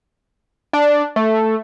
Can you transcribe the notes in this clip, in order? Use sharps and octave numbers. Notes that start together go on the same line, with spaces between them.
D4
A3